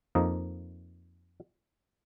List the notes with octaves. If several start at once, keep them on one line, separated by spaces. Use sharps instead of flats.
F2 F3 A#3 D#4 D#5